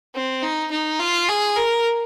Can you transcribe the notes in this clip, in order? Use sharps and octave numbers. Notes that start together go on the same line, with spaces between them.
C4
D#4
D#4
F4
G#4
A#4